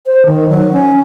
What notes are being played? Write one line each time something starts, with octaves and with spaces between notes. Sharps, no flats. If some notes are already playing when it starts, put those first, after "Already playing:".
C5
D#3
F#3
C#4